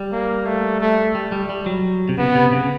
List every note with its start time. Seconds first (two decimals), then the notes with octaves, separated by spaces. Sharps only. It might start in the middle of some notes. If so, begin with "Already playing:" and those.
Already playing: G3
0.12 A#3
0.46 A3
0.81 A3
1.15 G3
1.32 G3
1.50 G3
1.66 F#3
2.09 C3
2.18 C#3 B3
2.35 C3
2.53 C#3